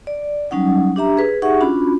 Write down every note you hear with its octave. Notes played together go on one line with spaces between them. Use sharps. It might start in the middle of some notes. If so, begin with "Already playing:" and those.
D5
F#3 G3 C#4 D#4 F#5
D4 G4 E5 A#5
G#4 B4
D#4 G4 G#4 E5 F#5 C#6
C#4 D4 F4 F#4 B5